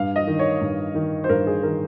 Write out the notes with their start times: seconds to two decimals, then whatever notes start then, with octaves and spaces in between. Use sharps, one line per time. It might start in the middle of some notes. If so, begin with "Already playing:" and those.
Already playing: G2 F5
0.16 D#5
0.27 D#3
0.39 C#5
0.61 G2
0.95 D#3
1.24 C5
1.29 G2 A#4
1.47 G#4
1.63 D#3 A#4